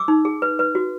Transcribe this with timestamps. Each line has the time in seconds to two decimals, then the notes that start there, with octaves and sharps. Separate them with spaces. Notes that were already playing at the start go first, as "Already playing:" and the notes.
Already playing: D6 E6
0.08 D#4
0.25 G#4
0.42 B4
0.59 B4
0.75 F#4